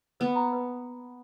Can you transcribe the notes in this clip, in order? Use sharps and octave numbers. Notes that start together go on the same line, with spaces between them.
B3 B4
A#5
B4